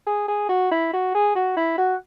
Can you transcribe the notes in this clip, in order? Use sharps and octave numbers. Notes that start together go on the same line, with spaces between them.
G#4
G#4
F#4
E4
F#4
G#4
F#4
E4
F#4